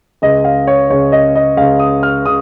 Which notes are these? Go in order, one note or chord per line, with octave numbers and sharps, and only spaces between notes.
C#2 C#3 D#5
F5
C#5
C#2 C#3 C#5
D#5
D#5
C#2 C#3 F5
D#6
F6
C#3 D#6